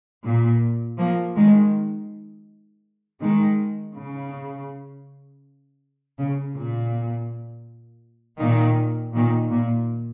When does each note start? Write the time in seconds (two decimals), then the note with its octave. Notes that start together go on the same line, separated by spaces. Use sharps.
0.25 A#2
0.98 F3 A#3
1.36 D#3 G#3
3.21 D#3 G#3
3.95 C#3
6.18 C#3
6.55 A#2
8.40 A#2 D#3
9.14 A#2 D#3
9.51 A#2